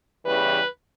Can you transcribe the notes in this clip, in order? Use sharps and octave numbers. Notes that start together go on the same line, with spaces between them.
E2 C#3 E3 G3 B4